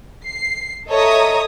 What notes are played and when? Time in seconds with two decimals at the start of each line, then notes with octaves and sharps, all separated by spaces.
0.25 C7
0.89 A4 C#5 D#5 E5 A#5 D#6